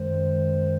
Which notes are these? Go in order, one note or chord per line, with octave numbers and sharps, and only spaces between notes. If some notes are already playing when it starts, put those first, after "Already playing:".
Already playing: F#2 D#3 G#3 C5